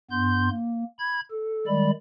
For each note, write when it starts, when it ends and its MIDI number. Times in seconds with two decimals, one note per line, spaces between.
0.11 0.49 43
0.11 0.49 59
0.11 0.49 84
0.11 0.49 91
0.50 0.84 58
0.99 1.20 83
0.99 1.20 92
1.31 1.66 69
1.67 1.91 51
1.67 1.91 55
1.67 1.91 56
1.67 1.91 74
1.67 1.91 83